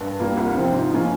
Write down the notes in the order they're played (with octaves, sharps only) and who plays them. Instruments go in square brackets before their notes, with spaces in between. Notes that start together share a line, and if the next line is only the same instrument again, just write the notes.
[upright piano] G2
G3 A#3 F4
C2
C3 F3 C4 F4
G#2
F3 A#3 C#4 F4